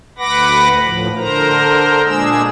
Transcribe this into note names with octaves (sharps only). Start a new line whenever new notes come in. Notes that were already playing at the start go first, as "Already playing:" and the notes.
D2 B4 F#5 B5 D6 A#6
A2 F3
D3 A#4 C5 A#5
A#2 G#3 D4 G#4 E6